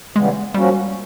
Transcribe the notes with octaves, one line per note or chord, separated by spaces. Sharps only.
C#3 E3 G3 G#3 B3
F3 G3 A#3 C#4 F#4